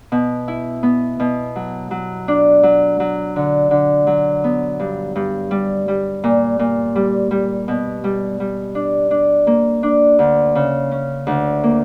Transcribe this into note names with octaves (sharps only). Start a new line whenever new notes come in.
B2
E4
B3
B2
F#3
F#3
D4
F#3
F#3
D3
D3
F#3
B3
G2
G2
G3
G3
A#2
A#2
G3
G3
B2
G3
G3
D4
D4
A#3
D4
D2
C#3
C#4
D2
A#3